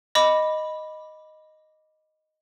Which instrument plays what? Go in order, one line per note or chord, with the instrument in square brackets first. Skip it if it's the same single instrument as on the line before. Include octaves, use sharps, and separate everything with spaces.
[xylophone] D#5 B5 D6